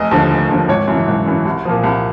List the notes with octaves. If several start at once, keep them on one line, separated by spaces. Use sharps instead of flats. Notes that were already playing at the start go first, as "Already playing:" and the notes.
Already playing: F1 D#5
D#2 D3 F3
F1
D#2 D3 F3
G#1 C#5
F#2 C#3 E3
G#1
F#2 C#3 E3
C2
A#2 F3
C2